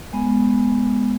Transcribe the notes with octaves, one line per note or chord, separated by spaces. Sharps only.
G#3 B3